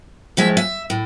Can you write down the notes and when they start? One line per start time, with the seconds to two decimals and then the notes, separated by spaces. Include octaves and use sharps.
0.37 A2 F3 G#3 E5
0.57 E5
0.90 A2